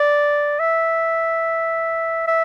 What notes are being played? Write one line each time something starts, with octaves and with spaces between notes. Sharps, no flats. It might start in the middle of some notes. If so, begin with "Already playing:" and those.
Already playing: D5
E5
E5